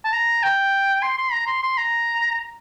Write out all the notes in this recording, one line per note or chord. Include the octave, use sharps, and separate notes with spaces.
A5
A#5
G5
C6
C6
A#5
C6
C6
A#5